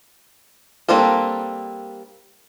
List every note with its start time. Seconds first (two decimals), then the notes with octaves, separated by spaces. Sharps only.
0.88 G3 A#3 C4 D4 A4